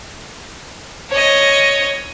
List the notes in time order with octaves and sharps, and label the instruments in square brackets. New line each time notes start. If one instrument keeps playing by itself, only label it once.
[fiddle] C#5 D#5